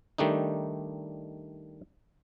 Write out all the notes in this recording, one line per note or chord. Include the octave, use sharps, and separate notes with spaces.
D#3 G3 A3 D4 D#4